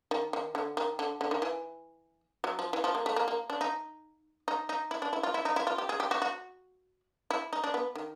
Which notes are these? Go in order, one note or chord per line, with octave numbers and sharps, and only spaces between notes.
D#3
D#3
D3
D#3
D3
D3
D#3
E3
F#3
F3
E3
F3
A#3
A3
A#3
A#3
D4
D#4
D#4
D#4
E4
D4
E4
F4
E4
D#4
E4
F4
G4
G#4
G4
F#4
F#4
E4
D#4
D4
B3
D#3